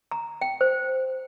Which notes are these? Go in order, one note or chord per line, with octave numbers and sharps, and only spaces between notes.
A#5
G5
C5